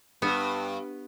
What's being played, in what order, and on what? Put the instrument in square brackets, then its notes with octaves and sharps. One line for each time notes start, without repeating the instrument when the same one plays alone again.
[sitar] G2 [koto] B3